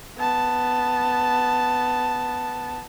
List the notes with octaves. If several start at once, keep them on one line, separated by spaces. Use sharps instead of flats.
B3 A5